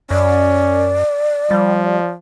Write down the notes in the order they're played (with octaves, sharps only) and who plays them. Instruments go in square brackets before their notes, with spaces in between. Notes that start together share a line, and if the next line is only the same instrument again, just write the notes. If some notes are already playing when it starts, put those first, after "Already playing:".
[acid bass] F#2 [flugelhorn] C#4 [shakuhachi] D5
[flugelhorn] F3 [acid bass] G3